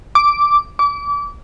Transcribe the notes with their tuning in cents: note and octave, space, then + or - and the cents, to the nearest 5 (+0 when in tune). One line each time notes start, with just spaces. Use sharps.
D6 -5
D6 -30